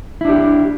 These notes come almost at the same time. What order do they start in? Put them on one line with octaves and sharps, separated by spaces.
E4 D4 G4